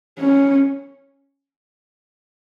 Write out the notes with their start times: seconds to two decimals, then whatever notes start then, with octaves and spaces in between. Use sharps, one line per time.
0.19 C#4